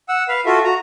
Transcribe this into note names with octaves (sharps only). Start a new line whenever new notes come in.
F#5 E6
B4 F5
F4 F#4 A4 E5
F#4 A#5